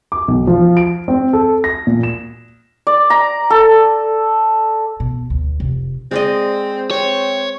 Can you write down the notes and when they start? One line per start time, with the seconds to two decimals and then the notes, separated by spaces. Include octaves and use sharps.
0.12 D6
0.28 B1
0.47 F3
0.77 D7
1.08 C4
1.33 A4
1.64 A#6
1.87 A#2
2.03 E7
2.87 D5
3.10 A#5
3.50 A4
5.00 B2
5.30 D2
5.60 F1
6.11 G#3 C4 D5 D#5
6.91 C4 C#5